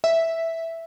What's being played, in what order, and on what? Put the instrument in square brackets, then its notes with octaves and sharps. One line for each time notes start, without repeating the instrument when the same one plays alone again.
[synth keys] E5